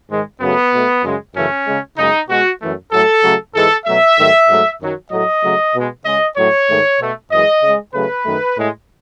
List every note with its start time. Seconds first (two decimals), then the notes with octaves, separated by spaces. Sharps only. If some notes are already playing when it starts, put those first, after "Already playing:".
0.09 G#2 D#3 G#3
0.41 F#2 C#3 F#3 A3 B3
0.72 B2 A3
1.04 F#2 C#3 G#3
1.35 F#2 C#3 E3 A3 C#4
1.66 C#3 G#3
1.98 F#2 C#3 G#3 D#4
2.29 B2 G#3 F#4
2.61 F#2 E3 A3
2.92 A2 F#3 A3 A4
3.24 C#3 F#3 A3
3.55 G#2 E3 G#3 A4
3.86 B2 F#3 A3 E5
4.18 G#2 D#3 F#3 A3
4.49 G#2 F#3 A3
4.81 F#2 D#3 F#3
5.12 A2 F#3 A3 D#5
5.43 C#3 F#3 A3
5.74 B2 G#3
6.05 C#3 G#3 D#5
6.37 A2 F#3 A3 C#5
6.69 G#2 D#3 A3
7.00 B2 A3
7.31 F#2 E3 G#3 D#5
7.63 C#3 G#3
7.94 C#3 F#3 A3 B4
8.25 F#2 D#3 A3
8.57 A2 G#3